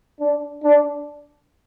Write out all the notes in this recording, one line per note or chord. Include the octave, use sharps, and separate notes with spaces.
D4
D4